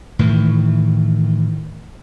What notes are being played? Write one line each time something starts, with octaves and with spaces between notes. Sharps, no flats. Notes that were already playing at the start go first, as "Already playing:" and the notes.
A2 D#3 E3